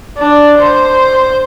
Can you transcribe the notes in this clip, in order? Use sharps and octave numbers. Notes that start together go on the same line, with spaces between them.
D4
C5